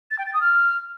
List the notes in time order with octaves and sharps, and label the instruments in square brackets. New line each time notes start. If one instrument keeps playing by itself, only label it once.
[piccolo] A6
G5
A6
D#6
F6